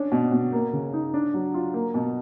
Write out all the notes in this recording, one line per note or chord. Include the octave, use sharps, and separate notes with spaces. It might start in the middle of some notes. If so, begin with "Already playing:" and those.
Already playing: C#4 D4
B2
B2
A#3
C#3
D#4
D4
F#3
F4
A#3
B2